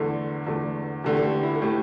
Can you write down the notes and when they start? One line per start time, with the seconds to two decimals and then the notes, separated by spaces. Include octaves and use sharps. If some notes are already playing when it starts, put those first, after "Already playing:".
Already playing: E2 D3 A3 A4
0.46 E2 D3 A3
1.04 E2 D3 A3 G4
1.17 A4
1.24 G4
1.43 E4
1.55 A4
1.62 A2 A3 G4